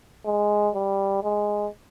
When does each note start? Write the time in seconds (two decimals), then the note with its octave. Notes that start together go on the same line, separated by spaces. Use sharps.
0.26 G#3
0.75 G3
1.23 G#3